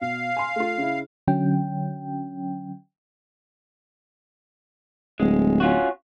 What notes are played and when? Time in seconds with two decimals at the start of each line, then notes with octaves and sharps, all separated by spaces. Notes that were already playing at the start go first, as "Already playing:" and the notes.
0.01 B2 F5
0.37 G#5 C6
0.56 A3 F4
0.78 C#3 E4
1.28 D3 F#3 C#4 G5
5.20 D1 G#3
5.60 C#4 F4 F#4